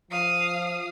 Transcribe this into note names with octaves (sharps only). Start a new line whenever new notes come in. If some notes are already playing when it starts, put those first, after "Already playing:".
F3 F5 D#6